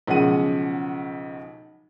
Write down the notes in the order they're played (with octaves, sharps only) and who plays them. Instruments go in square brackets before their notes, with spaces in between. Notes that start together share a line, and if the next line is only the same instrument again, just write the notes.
[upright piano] B1 C#3 F3 G#3 F#5 D#7